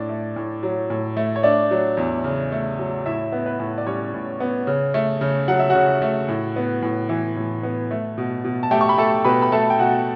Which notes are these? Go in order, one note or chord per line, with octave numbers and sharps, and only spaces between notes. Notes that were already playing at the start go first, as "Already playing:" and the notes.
Already playing: A2 D4 D5
A3
A2
F#3
A2
A3
C#5
A3 D4 D5
F#3
E2
C#3
A3
F#3
A2 E4 E5
B3
B4
A2
D5
G3 C#4 C#5
A2
B3
C#3
A3
C#3
F#3 F#5
E5
C#3 F#4 F#5
A3
A2
B3
A2
E3
A2
B3
A3
B2
B2
A5
A3 G4 G5
C#6
B5
A3 A4 A5
B2 B4 B5
B5
A3 A4 A5
G5
B2 F#4 F#5